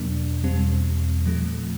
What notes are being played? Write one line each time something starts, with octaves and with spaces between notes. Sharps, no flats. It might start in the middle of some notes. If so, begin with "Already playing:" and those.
Already playing: E2 B2 F#3 A#3 D4
E2 B2 G3 C4
A#2 F3 A3